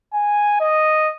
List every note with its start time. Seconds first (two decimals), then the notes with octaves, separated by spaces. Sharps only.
0.13 G#5
0.60 D#5